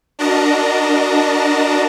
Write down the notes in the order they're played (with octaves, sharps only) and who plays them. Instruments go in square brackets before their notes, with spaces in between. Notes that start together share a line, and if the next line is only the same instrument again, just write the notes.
[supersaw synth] D4 F#4 A#4 D#5 A5 A#5